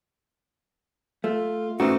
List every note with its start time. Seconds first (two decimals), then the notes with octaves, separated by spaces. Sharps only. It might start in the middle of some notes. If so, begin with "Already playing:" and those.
1.24 A3 F4
1.80 G#2 E3 A3 C#4 D#4 F#4